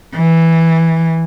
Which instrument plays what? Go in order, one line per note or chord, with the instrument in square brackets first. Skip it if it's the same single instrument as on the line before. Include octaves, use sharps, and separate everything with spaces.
[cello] E3